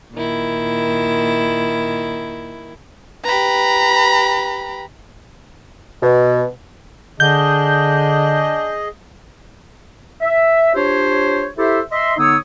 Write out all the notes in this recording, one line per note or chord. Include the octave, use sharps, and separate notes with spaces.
A#2 D#3 E4
G4 B4 A#5 B5
B2
D3 D4 G#4 D#5 G6
E5
D4 F4 G4 C5 C#5
E4 G4 A4 C5 E5
D#5 E5 C6
D3 B3 D#4 C#5 D#6 E6